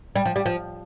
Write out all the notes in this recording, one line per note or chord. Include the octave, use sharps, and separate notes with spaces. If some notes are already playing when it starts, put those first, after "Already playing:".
G3
F3
G3
F3